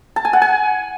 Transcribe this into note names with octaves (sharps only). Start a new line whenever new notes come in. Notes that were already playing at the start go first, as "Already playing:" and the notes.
A5
G#5
F#5
G#5